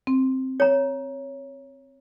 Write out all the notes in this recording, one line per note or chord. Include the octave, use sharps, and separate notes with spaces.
C4
C#5 A#5